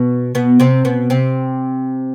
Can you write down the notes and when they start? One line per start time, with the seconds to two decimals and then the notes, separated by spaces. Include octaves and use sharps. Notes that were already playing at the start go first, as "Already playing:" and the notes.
Already playing: B2 B3
0.35 B2 B3
0.60 C3 C4
0.85 B2 B3
1.10 C3 C4